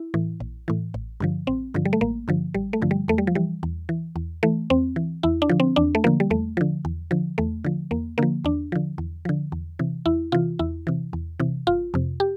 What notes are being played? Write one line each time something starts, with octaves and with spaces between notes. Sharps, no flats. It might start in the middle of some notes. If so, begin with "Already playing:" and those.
Already playing: E4
A2 E3
A#1
A2 E3
A1
G2 D3 F3
A1 C4
G2 D3 F3
G3
A3
A1 A#3
G2 D3 F3
A1 G3
A3
G2 D3 F3
G3
E2 A3
G3
F3
E3 G3
E2
E3
E2
E3 A3
E2 C4
E3
E2 E4
D4
D3 F3
C4
E2 D4
A3
D3 F3 A#3
G3
E2 A3
D3 F3
E2
D3 F3
E2 A3
D3 F3
E2 A#3
D3 F3 A#3
E2 D4
D3 F3
E2
D3 F3
E2
C3 E3
E2 E4
C3 E3 F4
E2 E4
C3 E3
E2
C3 E3
G1 F4
F2 C3
G4